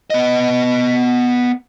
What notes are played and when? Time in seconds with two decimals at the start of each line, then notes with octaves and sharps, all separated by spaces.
0.10 B3 D#5